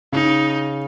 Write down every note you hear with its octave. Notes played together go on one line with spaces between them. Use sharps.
C#3 D#4